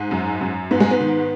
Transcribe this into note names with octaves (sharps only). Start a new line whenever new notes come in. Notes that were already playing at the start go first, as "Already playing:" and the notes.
Already playing: G#2
F#2
F#2
G#2 B3
G#3
B3
D#3